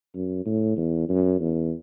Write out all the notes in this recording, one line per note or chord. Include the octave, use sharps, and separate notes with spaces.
F#2
A2
E2
F#2
E2